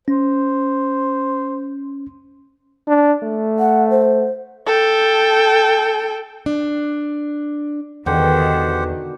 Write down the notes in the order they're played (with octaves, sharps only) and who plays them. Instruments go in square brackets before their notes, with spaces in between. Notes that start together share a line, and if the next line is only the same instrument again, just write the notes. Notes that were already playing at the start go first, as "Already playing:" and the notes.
[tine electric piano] C#4 [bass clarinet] C5
[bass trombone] D4
A3
[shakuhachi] F#5
C5
[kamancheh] A4 G5
[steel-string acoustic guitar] D4
[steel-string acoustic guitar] E2 [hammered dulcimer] B2 D3 G5 [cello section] D#3 [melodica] G4 C5 F#5